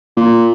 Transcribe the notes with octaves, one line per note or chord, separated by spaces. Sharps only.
A#2